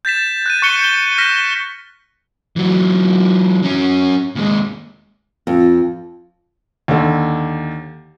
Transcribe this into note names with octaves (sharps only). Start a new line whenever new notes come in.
G6 A6 B6 E7
F#6 A6 D#7
C#6 F#6 C#7 G7
G6 G7
F6 A#6 B6 E7
E3 F#3
F#3 C#4
D#2 G#3
F2
D#2 D3